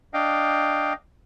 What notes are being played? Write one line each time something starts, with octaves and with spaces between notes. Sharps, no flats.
D4 D#5 F5 G5